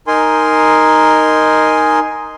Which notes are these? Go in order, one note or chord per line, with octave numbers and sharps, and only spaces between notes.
D#4 A#4 G#5 C6